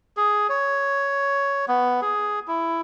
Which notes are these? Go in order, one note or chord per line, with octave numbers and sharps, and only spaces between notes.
G#4
C#5
B3
G#4
E4